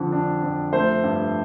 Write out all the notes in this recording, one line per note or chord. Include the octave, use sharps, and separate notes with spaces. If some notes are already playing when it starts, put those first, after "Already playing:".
Already playing: F2 D3 F3
D4
F2
A3 C5
G2